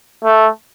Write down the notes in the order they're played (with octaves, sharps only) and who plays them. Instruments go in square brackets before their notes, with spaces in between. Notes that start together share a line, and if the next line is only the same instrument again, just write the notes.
[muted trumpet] A3